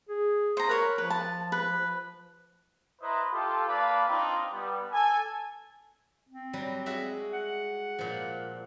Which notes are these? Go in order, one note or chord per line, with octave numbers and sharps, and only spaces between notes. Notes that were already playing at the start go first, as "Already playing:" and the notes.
G#4
C5 A#5
A#4 B4 C#5
F3 B4
A5
B4
E4 B4 C5 D#5 E5 A#5
F4 G4 A4
A#3 B4 D5 F5 A5 B5
C4 D4 D#4 F4
G3 B3
A4 G#5
C4
F#3 G3
G#3 F#4 E5
F#5
A#2 F3